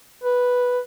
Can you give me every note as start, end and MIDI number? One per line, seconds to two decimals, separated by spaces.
0.24 0.80 71